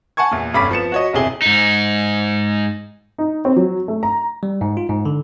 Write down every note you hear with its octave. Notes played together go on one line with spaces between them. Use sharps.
F#5 G#5 A5 C#6 G#6
E2 A#2
F1 G2 C#4 B5 D6 B6
F3 B3 C#7 E7
F#4 C#5 D#5
G1 E2 C3 E4 G#4 G7
G#2 D#4
D#4
C4
F#3
A3
A#5
G3
G#2
F4
G#2
D3